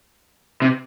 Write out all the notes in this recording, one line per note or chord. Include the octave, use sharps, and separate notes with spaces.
C3